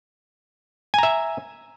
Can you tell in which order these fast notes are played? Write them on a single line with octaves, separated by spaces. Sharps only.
G#5 A#5 E5